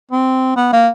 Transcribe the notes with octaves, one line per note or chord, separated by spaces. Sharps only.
C4
B3
A#3